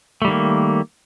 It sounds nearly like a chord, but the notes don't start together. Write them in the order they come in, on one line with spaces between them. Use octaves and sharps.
A3 G3 D#3 A#3